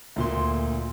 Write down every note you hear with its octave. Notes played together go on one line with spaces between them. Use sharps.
D2 A#2 C6